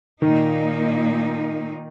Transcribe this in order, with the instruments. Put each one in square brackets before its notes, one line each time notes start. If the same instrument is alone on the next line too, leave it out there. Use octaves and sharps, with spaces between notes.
[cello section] A#2 A#3 D#4 [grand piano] D#3